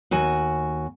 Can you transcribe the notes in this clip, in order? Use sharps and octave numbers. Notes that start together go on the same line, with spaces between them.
D#2 F#4 G#5